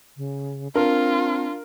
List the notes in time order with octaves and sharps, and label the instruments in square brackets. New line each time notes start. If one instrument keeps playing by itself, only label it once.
[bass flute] C#3
[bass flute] C4 [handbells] D4 [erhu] F4 [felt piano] A#4